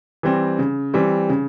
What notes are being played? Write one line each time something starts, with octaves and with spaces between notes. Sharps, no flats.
E3 G3 C4
C#3
E3 G3 C4
C#3